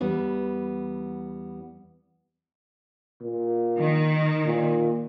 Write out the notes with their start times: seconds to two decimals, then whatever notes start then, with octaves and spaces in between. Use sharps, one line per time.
0.01 E2 G3 B3
3.21 A#2
3.78 D#3
4.46 A#2